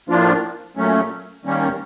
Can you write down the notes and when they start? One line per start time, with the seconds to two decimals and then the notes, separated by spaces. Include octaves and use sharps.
0.09 A2 F3 A#3 D4 F4
0.77 A#2 F#3 A3 C#4
1.45 D#3 G3 A#3 C#4